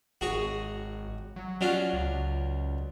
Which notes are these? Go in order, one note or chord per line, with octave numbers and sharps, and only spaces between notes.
G#1 F#4 G#4 C#5
F#3
F#3 C#4 D4 F4
C#2